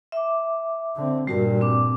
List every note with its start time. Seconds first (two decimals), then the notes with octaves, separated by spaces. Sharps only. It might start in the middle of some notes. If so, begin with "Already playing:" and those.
0.12 E5 D6
0.96 D3 C4
1.27 G2 A#2 G3 F#4 A#4
1.61 C4 D6